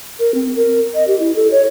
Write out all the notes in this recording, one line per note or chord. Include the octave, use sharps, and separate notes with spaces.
A#4
C4
A#4
D#5
G4
E4
A4
C#5